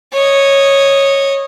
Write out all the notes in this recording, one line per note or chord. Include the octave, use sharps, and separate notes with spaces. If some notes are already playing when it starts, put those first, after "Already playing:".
C#5 D#5